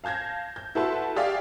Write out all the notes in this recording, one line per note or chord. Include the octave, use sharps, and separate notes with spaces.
F5 A5 G6 G#6 A#6
G6
E4 F#4 A4 B4 A5 C6
G4 G#4 D5 E5 F5 G5